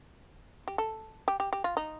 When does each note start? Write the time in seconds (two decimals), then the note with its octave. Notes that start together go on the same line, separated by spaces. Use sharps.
0.68 G4
0.78 A4
1.28 G4
1.40 G4
1.53 G4
1.64 F4
1.77 D#4